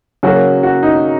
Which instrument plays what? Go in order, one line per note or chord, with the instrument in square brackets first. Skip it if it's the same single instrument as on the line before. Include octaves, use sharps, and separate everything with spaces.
[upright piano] C#3 F#3 A#3 F#4
F#4
D#4